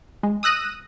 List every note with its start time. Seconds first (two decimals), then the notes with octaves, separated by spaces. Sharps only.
0.23 G#3
0.43 D#6 E6 F#6 A#6 D#7